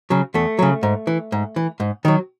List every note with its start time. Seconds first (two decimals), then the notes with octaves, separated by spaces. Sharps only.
0.10 C#3 F#3
0.34 E2 A3
0.59 C#3 F#3
0.83 G#2
1.07 E3
1.32 G#2
1.56 E3
1.80 G#2
2.05 D#3 F#3